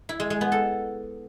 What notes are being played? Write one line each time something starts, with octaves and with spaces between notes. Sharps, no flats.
E4
G#3
G#3
B3
A4